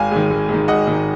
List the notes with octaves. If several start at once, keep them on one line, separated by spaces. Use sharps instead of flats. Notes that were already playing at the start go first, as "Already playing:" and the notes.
Already playing: G#1 F5 G#5
G#2 D#3
G#1
G#2 D#3
G#1 D#5 F#5
G#2 D#3